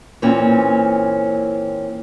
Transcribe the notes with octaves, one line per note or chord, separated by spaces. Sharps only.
A#2 E3 A#3 C4 C#4